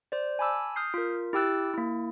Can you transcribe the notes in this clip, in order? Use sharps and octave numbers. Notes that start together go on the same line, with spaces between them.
C5 D5
G#5 A5 B5 D6 E6
D#6 F6 G6 C7
F4 A#4
E4 G4 G5 E6 F#6 A6
A#3 E4